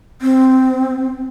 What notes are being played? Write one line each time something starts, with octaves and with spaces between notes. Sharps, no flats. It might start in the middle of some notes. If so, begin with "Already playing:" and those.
C4